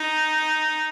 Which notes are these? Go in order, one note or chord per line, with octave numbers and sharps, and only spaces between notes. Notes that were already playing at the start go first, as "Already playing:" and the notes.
Already playing: D#4